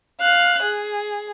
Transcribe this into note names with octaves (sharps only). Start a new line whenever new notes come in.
F5 F#6
G#4